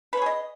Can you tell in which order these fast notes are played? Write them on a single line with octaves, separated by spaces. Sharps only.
B4 C#5 G#4 D#5